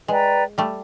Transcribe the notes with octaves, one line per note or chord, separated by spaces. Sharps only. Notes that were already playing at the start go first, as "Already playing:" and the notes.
G#3 B4 D5 G5 A#5
G3 A3